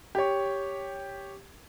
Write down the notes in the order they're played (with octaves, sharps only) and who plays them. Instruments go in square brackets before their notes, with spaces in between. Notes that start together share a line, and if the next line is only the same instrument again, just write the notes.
[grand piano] G4 C#5